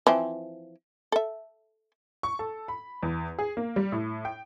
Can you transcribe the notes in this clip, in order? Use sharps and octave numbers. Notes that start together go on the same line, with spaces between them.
E3 F3 C4
A4 E5
C#6
A4
B5
E2
G#4
A#3
G3
A2
G5